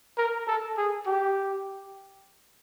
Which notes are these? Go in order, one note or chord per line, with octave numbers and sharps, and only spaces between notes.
A#4
A4
G#4
G4